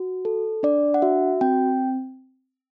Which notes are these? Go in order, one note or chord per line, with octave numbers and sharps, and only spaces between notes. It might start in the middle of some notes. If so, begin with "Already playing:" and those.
Already playing: F#4
A4
D4 D5
F#5
F#4 E5
C4 G5